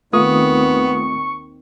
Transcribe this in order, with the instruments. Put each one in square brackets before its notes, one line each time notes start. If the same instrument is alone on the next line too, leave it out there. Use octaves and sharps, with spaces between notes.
[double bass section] D#2 D#3 C4 [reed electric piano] A3 F4 D#6 [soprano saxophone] B3 [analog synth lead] C#6